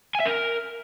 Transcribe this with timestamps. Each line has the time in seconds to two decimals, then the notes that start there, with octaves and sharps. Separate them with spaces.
0.15 G#5
0.20 E5
0.26 A#4